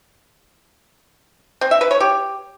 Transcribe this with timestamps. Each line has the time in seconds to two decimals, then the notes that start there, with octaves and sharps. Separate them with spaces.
1.61 C4
1.71 E5
1.81 B4
1.91 C#5
2.00 G4